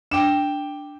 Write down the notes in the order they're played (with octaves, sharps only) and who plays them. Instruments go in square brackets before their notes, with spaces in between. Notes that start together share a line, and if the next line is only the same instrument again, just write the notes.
[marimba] D4 [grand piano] G5 D6 E7